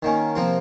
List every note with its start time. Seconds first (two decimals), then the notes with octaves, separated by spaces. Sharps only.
0.02 D#3 A#3 C#4
0.35 C3 F3 A#3 F4